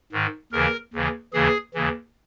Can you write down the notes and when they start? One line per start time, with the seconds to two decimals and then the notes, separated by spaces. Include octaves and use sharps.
0.12 G#2 D#3
0.52 D#2 C#3 E3 A#4
0.93 D#2 C#3 E3
1.33 D#2 C#3 E3 G#4
1.74 D#2 C#3 E3